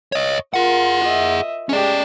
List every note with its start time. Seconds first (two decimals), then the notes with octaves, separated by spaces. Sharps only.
0.12 C#5 D#5
0.54 F4 G#4 A#4 F#5
1.04 D#5 E5
1.69 G#3 C#4 G4 D5